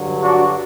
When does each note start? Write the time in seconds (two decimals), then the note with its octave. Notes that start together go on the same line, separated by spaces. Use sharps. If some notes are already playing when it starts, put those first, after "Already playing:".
Already playing: G2 D3 F#3
0.22 D4 F#4